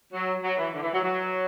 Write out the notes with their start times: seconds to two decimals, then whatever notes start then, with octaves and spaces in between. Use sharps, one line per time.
0.13 F#3
0.44 F#3
0.58 E3
0.73 D3
0.82 E3
0.92 F#3
1.02 F#3